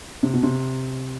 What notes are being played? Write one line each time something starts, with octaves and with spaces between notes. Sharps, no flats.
C3
B2
C3